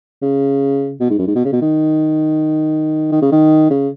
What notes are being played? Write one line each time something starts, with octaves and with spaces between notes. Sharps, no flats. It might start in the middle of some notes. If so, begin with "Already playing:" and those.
C#3
B2
G#2
F#2
G#2
B2
C#3
B2
D#3
D#3
C#3
D#3
C#3